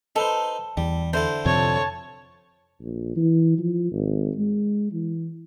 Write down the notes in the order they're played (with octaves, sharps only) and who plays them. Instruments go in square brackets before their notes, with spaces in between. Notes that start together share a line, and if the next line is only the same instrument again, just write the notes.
[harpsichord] D#4 B4 C5 [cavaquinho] A4
[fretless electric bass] E2 [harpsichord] G3
[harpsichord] D3 E4 A4 [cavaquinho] C5
[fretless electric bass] F2 C3 [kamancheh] C#5 A5
[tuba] A#1
E3
F3
G#1
G#3
E3